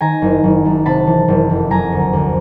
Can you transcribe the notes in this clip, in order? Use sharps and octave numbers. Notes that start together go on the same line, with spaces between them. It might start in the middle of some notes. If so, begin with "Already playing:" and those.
D#3 G#5 A#5
F#1
F#1
F#2
C3 A5 B5
E3
F#1
F2
F#3 G#5 A#5
D2
D2